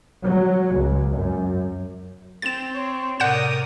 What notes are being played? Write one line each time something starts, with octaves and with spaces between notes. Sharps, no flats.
F#3
C#2
F#2
C4 A6 E7
C#5 C6
A2 C3 A#4 D5 F#5 D#6 G6 E7